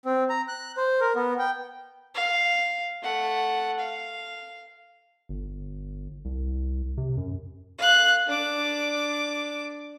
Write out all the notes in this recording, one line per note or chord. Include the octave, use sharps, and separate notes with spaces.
C4
A#5
F#6
C5
A#4
B3
G5
F5
A3 F#5
F5
G1
C2
C3
F#2
F5 F#6
D4 D6